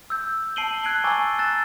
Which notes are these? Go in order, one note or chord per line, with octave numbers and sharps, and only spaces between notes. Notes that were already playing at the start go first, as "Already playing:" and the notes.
E6 G6
A5 C7 D7 D#7 F#7 G7
F#6 G#6 C7 D7 D#7 G7
G#5 A#5 C#6 D6 E6 A6
E6 F#6 A6 E7